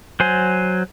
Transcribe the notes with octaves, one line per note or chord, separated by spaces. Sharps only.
F#3 C5 G#5